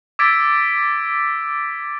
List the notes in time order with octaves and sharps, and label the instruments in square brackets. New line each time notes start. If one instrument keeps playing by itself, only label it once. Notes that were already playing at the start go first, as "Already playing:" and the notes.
[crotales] D6 E6 G#6 A6 B6 D7